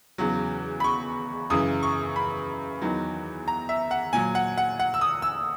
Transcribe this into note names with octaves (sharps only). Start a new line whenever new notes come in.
E2 C#3 F#3
B5
C#6
F#2 C#3 E3 D#6
C#6
B5
E2 D#3 F#3
A#5
E5
F#5
A#2 F#3 G#5
F#5
F#5
F#5
E6
D#6
E6